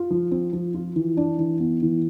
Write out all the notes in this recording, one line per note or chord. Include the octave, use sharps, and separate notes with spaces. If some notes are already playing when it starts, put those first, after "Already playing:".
Already playing: F4
F3
C4
F3
F4
E3
D4
E3
B3
E3